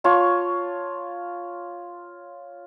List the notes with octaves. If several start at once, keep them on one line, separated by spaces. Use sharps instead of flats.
F4 C#5 A5 C#6